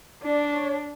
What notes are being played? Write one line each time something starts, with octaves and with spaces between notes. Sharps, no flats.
D4 D5
C#5